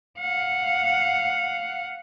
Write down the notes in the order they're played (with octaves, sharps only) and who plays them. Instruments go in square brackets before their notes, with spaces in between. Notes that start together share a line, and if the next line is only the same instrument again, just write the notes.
[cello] F5 F#5